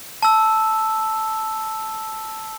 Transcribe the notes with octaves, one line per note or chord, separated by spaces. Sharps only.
A5 E6